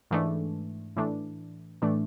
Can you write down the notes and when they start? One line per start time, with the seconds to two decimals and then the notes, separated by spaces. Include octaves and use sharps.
0.11 G#2 E3 A3 D4
0.96 A2 E3 A3 D4
1.82 A2 E3 A3 D4